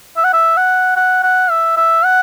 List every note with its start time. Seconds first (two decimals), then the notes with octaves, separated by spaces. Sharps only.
0.17 E5
0.24 F#5
0.34 E5
0.57 F#5
0.96 F#5
1.23 F#5
1.50 E5
1.77 E5
2.04 F#5